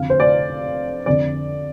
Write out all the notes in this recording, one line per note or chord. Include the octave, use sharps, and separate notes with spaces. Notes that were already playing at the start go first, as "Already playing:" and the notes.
Already playing: F2 D3 F5
C5
D5
F2 D3 D5